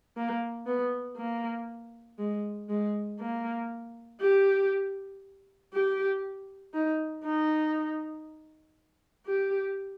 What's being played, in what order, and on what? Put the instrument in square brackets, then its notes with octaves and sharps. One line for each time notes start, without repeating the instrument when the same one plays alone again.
[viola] A#3
B3
A#3
G#3
G#3
A#3
G4
G4
D#4
D#4
G4